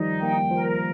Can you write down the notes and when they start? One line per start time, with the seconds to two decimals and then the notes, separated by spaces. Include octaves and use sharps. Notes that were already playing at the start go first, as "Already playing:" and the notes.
Already playing: D#3 F3 G3 D#4
0.22 A#3 G5
0.51 F3 A#4